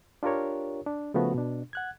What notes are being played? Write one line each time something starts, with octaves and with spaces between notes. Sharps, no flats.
D4 F4 G4 A#4 C#5
D4
C#3 F3 A3 B3 F#4
B2 D4
F#5 F#6 G#6